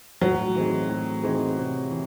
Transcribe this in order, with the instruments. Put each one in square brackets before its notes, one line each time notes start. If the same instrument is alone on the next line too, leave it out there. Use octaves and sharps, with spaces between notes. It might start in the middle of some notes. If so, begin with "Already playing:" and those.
[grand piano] A2 [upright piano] F#3
[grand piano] E3 C4 D#4 G#4
A2
E3 C4 D#4 G#4
C3
E3